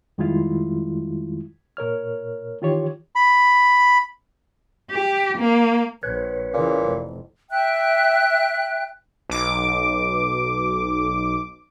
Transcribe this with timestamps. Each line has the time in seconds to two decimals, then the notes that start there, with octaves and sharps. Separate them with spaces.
0.18 F2 D#3 G3 G#3 E4 F4
1.77 A#2 A#4 C#5 F6
2.61 D#3 E3 F4 G4 C#5
3.16 B5
4.91 G4
5.38 A#3
6.03 A#1 B4 C#5
6.54 A#2 C#3 E3
6.87 F1
7.51 E5 G5 F#6
9.30 B1 D6